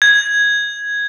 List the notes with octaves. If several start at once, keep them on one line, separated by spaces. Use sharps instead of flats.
G#6